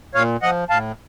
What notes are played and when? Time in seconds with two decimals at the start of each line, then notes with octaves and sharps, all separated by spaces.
0.15 A#2 C#5 F5
0.42 F3 D#5 F#5
0.69 A2 F5 A5